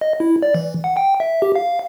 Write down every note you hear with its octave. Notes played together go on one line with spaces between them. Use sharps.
D#5
E4
D5
E3
F#5
G5
E5
G4
F5